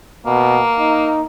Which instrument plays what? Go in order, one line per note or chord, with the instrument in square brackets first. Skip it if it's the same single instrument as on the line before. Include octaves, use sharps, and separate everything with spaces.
[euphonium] B2 [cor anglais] A#3
[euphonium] D#4